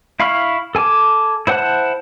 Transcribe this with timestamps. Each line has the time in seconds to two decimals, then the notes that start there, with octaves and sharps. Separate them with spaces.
0.20 E4 F5 B5 C#6 F6
0.75 A4 G#5 A5 D6
1.47 E4 C5 F#5 A5 F#6